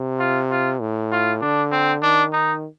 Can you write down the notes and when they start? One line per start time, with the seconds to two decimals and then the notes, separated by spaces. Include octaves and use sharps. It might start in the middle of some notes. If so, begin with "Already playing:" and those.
Already playing: C3
0.20 F4
0.51 F4
0.81 A2
1.12 F4
1.41 D3 D4
1.72 C4
2.02 D#3 D4
2.33 D#4